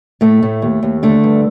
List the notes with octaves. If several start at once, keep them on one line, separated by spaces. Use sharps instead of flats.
A2 A3
A2
D#2
D#2
D3 A3
G2